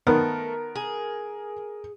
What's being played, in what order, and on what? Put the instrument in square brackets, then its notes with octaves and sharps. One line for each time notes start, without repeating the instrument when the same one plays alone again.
[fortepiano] D#3 B3 [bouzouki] A3 [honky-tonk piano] A#4
[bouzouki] G#4